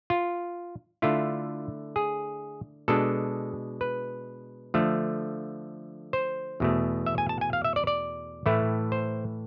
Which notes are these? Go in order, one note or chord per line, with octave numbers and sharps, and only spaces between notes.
F4
D3 A3 E4 F4
G#4
B2 G#3 D4 A4
B4
D3 F3 A3
C5
E2 B2 A3
E5
G#5
A5
G#5
F5
E5
D5
D5
A2 E3 A3 E4
C5